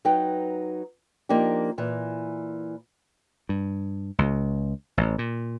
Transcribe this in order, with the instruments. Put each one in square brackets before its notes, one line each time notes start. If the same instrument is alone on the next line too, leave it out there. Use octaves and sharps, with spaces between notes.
[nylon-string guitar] F#3 D#4 B4 G5
F3 A#3 D4 D#4 G4
A#2 E3
[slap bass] G2
C#2
A1
A#2